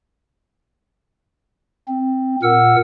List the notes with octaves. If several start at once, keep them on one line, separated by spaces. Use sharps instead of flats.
C4
A#2 A#4 F#5 E6